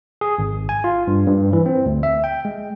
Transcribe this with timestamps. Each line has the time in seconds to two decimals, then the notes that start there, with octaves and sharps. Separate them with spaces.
0.21 G#4
0.38 G#1
0.69 G#5
0.84 F4
1.07 G2
1.27 G2
1.53 E3
1.66 C4
1.86 D2
2.03 E5
2.24 G5
2.45 G#3